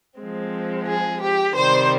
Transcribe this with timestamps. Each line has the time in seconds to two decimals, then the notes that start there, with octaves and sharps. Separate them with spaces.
0.20 F3 G#3 C4
0.87 G#4
1.21 G4
1.55 C3 D#3 G3 C5